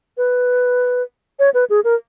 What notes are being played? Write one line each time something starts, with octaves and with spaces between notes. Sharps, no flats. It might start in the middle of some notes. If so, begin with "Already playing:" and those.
B4
C#5
B4
G#4
A#4